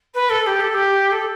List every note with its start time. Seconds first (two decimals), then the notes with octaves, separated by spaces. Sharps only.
0.14 B4
0.29 A4
0.46 G4
0.60 A4
0.74 G4
1.11 A4